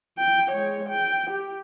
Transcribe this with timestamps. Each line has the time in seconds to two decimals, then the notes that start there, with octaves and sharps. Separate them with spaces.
0.18 G5
0.51 G#3 C#5
0.89 G5
1.30 G4